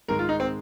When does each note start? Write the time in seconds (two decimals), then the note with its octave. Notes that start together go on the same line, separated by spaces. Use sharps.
0.08 G#2 D#3 G#3 A#4
0.19 F4
0.29 D#4
0.40 C4